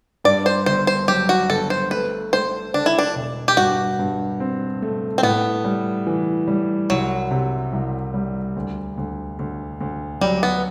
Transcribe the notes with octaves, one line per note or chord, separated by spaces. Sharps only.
G2 D5
C5
G1 C5
C5
F#3 G4
F#4
G1 A4
C5
A3 B4
A3 C5
D3 D4
E4
D4
E1
G4
G2 F#4
G2
C4
A3
C4
A2 B3
G3
E3
G3
C2 F#3
C3
C2
G3
D2
D2
D2
D2
F#3 G3
B3